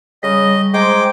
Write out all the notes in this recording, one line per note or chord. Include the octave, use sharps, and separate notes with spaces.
C#3 G3 D#5 C#6 D#6
G#3 C5 G5 A#5 C6 D6